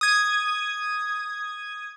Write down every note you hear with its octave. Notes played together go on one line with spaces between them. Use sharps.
D#6 G#6